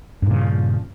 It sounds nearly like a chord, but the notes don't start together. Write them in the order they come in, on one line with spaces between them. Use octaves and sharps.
G2 A#2 C#3 F3